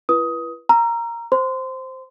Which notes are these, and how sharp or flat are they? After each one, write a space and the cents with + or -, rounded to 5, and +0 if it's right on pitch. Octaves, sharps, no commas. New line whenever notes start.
E4 +35 B4 -25 D#6 +15
A#5 +0 E6 +45
C5 +0 C6 -25